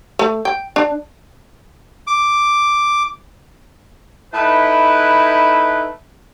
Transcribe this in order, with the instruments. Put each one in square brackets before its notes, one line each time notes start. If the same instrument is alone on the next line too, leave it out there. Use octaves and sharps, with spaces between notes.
[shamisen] A3
G5
D4
[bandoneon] D6
[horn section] A3 D#4 E4 B4